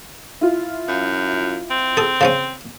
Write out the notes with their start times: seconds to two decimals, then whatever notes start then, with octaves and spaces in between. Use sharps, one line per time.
0.41 E4 F4
0.88 F#2
1.71 C4
1.97 G#4 A4
2.21 C#3 F3 C#4